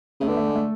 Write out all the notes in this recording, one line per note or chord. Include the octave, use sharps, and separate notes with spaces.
C#3 A3
D3 B3
A3
G#3
A3